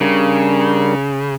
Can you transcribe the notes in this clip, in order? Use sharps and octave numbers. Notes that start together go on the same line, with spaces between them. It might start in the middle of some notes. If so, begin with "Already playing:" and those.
C#3 G3 D4 A#4